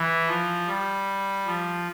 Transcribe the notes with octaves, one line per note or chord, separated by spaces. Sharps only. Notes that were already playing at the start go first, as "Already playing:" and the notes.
Already playing: E3
F3
G3
F3